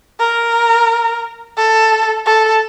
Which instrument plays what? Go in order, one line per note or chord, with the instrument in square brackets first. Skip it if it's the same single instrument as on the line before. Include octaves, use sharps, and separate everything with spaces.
[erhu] A#4
A4
A4